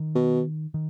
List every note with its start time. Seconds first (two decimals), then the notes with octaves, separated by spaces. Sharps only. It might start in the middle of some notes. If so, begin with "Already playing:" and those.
Already playing: D#3
0.15 B2
0.74 D#3